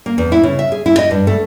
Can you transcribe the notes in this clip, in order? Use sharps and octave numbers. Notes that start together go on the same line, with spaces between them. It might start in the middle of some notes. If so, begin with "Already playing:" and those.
A#3
E2
E4
C#3
E5
G#4
E4
D#5
G2
A3